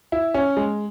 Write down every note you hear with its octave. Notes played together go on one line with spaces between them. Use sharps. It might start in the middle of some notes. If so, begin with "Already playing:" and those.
E4
C#4
G#3